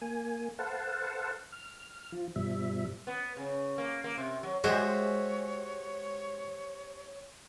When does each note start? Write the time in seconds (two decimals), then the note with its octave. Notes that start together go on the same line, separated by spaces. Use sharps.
0.02 A#3 G#5
0.59 A4 B4 C5 F5 F#5 A5
1.52 F6
2.12 F3 F4
2.36 G2 B2 F3 G3 E5
3.07 B3
3.37 C#3
3.78 A#3
4.04 A#3
4.18 C3
4.43 F#3
4.64 G#3 F#4 G4 C5 C#5 E5